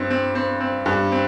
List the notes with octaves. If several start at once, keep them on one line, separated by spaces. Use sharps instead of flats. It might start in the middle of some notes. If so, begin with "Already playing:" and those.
Already playing: G2 C4
C4
C4
C4
G2
C4